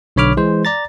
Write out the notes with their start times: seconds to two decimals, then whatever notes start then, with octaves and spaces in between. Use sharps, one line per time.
0.16 B1 D3 C#5 B5 D6 F6
0.37 E3 G#3 C5
0.65 D5 A#5 A6